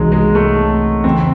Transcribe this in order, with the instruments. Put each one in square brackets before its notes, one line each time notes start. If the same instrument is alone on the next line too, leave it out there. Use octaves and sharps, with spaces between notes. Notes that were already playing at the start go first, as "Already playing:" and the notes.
Already playing: [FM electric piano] C2 C3 E3 C4 D#4 [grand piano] F#3 G#3
[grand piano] G#3
A3
[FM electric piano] E2 C#3 E3 A3 [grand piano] C4